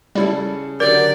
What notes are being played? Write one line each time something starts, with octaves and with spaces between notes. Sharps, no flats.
C#3 G3 E4 A4
D3 F#3 G4 A#4 D5